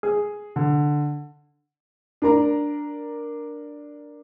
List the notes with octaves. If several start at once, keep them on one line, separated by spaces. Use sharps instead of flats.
G#4
D3
D4 A#4 A#5